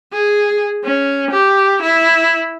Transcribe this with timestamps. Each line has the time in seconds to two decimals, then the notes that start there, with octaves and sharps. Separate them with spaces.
0.13 G#4
0.84 C#4
1.31 G4
1.82 E4